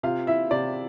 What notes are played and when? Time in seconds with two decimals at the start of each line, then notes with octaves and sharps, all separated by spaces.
0.03 C3 F4 F5
0.27 E4 E5
0.51 C3 D5